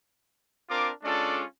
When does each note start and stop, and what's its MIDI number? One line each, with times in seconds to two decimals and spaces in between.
0.70 0.90 60
0.70 0.90 62
0.70 0.90 65
0.70 0.90 70
0.70 0.90 86
1.04 1.43 56
1.04 1.43 61
1.04 1.43 62
1.04 1.43 65
1.04 1.43 69
1.04 1.43 74